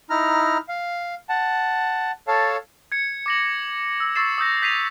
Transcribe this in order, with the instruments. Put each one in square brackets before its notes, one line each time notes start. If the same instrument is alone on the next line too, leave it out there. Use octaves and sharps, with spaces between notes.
[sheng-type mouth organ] D#4 E4 A#5 F6
F5
F#5 A5
A4 C#5 F5 A5
[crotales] G#6 C#7
D6 A#6 F#7
E6
C#6 E6 A6 C7 E7
D#6 E6 G6 A#6
G6 B6 C7 D#7 F7